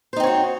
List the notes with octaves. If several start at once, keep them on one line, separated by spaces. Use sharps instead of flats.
C4 D#4 F#4 C5 C#5